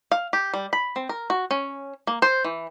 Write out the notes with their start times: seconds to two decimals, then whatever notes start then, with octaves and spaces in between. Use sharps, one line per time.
0.12 F5
0.33 G4
0.54 G3
0.73 B5
0.96 C4
1.09 A#4
1.30 F#4
1.51 C#4
2.07 A#3
2.22 C5
2.44 E3